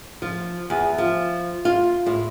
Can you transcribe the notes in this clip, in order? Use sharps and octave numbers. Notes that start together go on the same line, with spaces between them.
F3
E2
F3
F4
A2